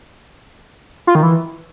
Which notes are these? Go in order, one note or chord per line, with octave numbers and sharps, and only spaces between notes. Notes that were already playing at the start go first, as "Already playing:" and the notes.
F4
D#3
E3